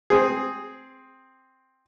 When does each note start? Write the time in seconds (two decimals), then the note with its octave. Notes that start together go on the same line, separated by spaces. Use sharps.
0.10 C4 G#4